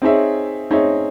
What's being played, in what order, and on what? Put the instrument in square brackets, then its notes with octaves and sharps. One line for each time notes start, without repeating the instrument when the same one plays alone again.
[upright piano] C4 D#4 G#4 C#5 E5
C4 D#4 G#4 C#5 E5